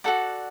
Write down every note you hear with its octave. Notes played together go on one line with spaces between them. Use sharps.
F#4 A4 D5 F#5